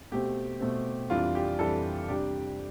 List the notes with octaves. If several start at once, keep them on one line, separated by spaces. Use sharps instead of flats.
B2 A3 C4 G4
B2 A3 C4
F2 E3 G3 D4 F4
G4
F2 E3 G3 D4 A4
C3 G3 D4 G4